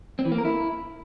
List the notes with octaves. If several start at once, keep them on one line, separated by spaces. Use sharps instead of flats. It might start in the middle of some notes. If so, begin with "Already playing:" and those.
C4
E3
A#3
A#4
E4